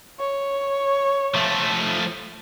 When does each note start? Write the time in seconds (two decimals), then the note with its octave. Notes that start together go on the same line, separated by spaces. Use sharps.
0.19 C#5
1.34 F3 A3